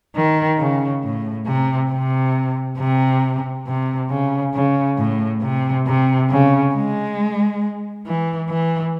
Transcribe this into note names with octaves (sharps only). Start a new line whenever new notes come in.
D#3
C#3
A2
C3
C3
C3
C3
C#3
C#3
A2
C3
C3
C#3
G#3
E3
E3